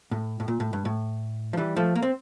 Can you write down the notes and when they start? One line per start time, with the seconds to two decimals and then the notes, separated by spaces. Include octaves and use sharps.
0.11 A2
0.40 A2
0.48 A#2
0.60 A2
0.73 G2
0.85 A2
1.53 F3
1.57 E3 G3
1.76 F3 A3
1.95 A#3
2.02 C4